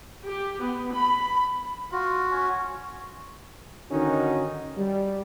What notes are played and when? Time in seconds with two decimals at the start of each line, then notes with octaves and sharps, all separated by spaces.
0.24 G4
0.62 B3
0.92 B5
1.92 F4 F#4
2.31 C#4
3.91 D3 D#3 C#4 D#4 F#4
4.77 G3